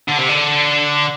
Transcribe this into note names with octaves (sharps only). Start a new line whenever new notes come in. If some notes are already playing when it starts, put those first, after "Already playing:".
D3
C3
D3